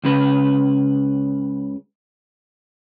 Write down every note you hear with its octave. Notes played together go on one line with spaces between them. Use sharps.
C#2 C#3 B4